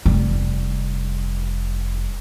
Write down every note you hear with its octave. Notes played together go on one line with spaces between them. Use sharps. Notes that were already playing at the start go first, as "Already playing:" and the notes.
F1 G3